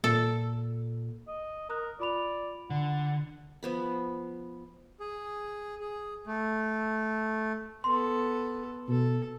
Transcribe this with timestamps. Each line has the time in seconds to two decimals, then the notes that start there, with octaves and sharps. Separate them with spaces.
0.04 A#2 A4
1.28 D#5
1.70 A#4 A#5 D#6 F#6
2.00 F4 D5 B5 F7
2.70 D3 F#5
3.63 F3 B3 B5
5.00 G#4
5.81 G#4
6.27 A3
7.84 B3 A4 C6
8.88 B2 A4